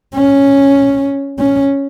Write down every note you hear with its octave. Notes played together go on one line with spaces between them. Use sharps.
C#4
C#4